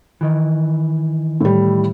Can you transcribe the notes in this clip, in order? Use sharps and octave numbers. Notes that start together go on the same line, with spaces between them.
D#3 E3
A2 G3